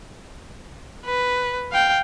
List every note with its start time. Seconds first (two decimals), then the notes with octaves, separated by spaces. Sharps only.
1.06 B4
1.72 F5 G5